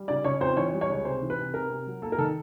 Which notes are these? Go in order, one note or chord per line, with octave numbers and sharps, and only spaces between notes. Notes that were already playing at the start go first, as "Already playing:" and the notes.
Already playing: G3
C#3 D5
C#3 C#5
F2 C5
E3 C#5
G3
C#5
C#2
C3 C5
E3
B4
C3
C3 A#4
C3
F#3
A#3 A4
A#4
D#3 A4